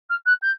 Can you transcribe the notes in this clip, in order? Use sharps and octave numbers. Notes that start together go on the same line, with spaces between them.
F6
F#6
G6